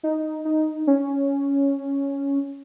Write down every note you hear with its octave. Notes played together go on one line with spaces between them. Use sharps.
D#4
D#4
C#4